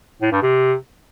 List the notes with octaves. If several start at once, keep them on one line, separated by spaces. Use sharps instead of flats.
A2
G2
C3